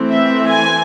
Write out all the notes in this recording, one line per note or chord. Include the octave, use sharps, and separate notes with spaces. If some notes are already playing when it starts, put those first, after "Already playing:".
Already playing: E3 A3 C4
E5
G#5